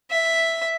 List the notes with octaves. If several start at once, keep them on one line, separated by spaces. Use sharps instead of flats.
E5